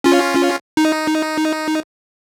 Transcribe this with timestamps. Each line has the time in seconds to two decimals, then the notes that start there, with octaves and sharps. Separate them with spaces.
0.04 C#4 F4
0.77 D#4